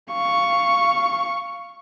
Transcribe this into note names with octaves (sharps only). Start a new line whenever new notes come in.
F5 C#6